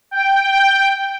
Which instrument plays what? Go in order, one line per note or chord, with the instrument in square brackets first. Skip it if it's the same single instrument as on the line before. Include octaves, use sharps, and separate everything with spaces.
[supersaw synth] G5